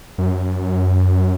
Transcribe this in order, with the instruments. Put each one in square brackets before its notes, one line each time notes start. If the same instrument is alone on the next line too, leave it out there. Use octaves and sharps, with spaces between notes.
[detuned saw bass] F#2